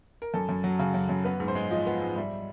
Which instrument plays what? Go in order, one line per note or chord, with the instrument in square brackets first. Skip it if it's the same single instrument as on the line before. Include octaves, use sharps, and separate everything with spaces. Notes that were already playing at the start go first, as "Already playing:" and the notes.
[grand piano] A#4
F#2 A4
F#2
F#3
C#3
F#2
F#2
B3 B4
G#2
C5
G#3
F3 D#5
B3
G#2
G3 E5